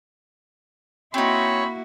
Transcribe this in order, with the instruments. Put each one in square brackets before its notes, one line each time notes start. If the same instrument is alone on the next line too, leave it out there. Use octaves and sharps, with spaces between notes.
[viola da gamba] A#3 E4 F#4 [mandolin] C4 D#4 [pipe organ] C#5 [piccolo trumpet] B5